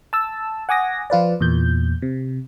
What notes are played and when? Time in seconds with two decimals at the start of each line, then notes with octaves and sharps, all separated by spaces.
0.13 A5 E6
0.69 F#5 G#5 D6 D#6 A#6
1.10 F3 F4 B4 D5
1.41 E2 A#2 G6
2.02 C3